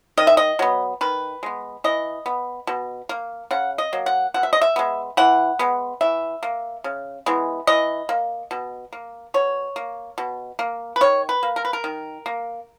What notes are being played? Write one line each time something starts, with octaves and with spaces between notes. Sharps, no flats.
D#3 D#5
E5
D#5
F#3 B3
D#3 B4
G#3 B3
E3 D#5
B3
B2
A#3
C#3 F#5
D#5
F#3 A#3
F#5
B2 F#5
E5
D#5
E5
G#3 B3
E3 F#5
G#3 B3
E3 E5
A#3
C#3
E3 G#3 B3
E3 D#5
A#3
B2
A#3
B2 C#5
A#3
B2
A#3
B4
D#3 C#5
B4
A#3
A#4
B4
A#4
D#3
A#3